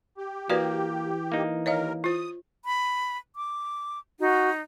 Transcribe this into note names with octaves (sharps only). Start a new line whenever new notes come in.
G4
E3 A#3 F#4 B4 D5
A#3 D#4
D#2 A#4 C#5 D#5 F5
F4 C5 D#6
B5
D6
D#4 F#4